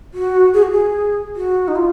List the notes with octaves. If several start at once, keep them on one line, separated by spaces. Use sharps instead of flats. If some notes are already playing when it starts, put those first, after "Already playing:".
F#4
G#4
F#4
G#4
F#4
D#4
F4